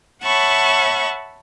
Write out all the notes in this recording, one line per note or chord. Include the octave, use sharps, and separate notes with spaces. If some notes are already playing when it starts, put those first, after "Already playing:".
C#5 E5 F#5 A5 B5 C#6